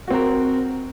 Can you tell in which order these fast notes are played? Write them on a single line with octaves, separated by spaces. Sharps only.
F#4 C4 A#4